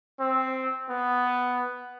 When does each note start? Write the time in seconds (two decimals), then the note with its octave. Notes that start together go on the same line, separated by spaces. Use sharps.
0.20 C4
0.90 B3